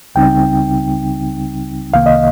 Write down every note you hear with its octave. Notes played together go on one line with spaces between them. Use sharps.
C#2 C#3 G3 C4 D#4 G5
C2 C3 D#3 A#3 F5
D#5